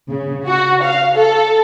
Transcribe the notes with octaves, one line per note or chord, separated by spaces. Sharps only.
C#3
F#4
F5
A4